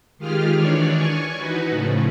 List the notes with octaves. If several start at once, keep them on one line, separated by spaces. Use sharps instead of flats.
D#3 G#3 F4 G4 G#4 F6
D#3 E3 D4 C#5 D5
G#5 C#6
E3 D#4 F#4 B4
A2 C#3 F3 A3